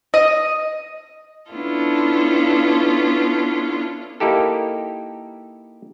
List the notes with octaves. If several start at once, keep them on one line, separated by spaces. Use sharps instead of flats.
D#5
B3 C#4 D4 E4 F4 A4
A#3 D#4 E4 G4 A4